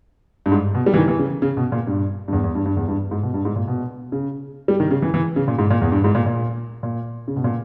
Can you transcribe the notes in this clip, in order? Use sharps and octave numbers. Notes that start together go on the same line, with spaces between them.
G2
G#2
B2
G3
E3
D#3
E3
C#3
C#3
B2
A#2
G2
G2
E2
E2
G2
G2
E2
G2
G#2
B2
G2
G#2
A#2
B2
C#3
G3
D#3
C#3
E3
E3
C#3
A#2
G#2
A#2
E2
G2
G#2
A#2
A#2
A#2
C#3
B2
A#2